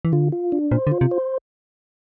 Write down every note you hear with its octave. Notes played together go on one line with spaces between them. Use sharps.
E3
D3 F4
F4
D4
A#2 C5
D3
F4
C3
C5